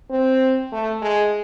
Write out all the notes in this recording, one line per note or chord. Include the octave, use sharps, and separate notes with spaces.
C4
A3
G#3